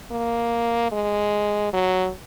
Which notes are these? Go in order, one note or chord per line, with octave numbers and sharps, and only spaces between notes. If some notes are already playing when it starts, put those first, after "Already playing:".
A#3
G#3
F#3